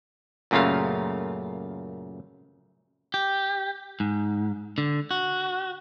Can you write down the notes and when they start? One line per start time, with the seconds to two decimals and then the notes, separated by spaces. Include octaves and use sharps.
0.51 F#2 A#2 C#3 A3 F4 F5
3.14 G4
4.00 G#2
4.78 D3
5.11 F#4